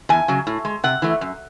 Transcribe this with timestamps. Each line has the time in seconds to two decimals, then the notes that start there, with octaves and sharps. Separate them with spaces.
0.09 E2 G#5
0.28 C#3 F#3
0.47 A2
0.65 G#3
0.84 C3 F#5
1.02 E3 A3
1.21 F#2